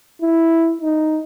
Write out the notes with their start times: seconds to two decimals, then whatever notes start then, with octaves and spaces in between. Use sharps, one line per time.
0.22 E4
0.81 D#4